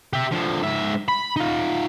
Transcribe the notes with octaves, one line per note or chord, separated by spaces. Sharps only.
G4 E5
D3 F3
G#2 E5
B5
D#4 F4